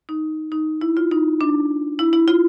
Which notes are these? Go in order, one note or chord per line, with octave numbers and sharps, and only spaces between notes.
D#4
D#4
E4
F4
D#4
D4
E4
E4
F4